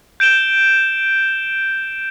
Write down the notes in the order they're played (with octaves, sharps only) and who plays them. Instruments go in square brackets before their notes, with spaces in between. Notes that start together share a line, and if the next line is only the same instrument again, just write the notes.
[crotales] G6 D7 E7 G7